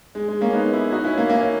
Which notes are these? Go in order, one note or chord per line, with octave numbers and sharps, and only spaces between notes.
G#3
G#3
A#3 C#4
B3 D#4
C#4 E4
D#4 F#4
C#4 E4
A#3 C#4
A#3 C#4